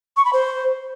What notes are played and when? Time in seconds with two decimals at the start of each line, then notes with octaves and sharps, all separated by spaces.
0.17 C#6
0.25 B5
0.33 C5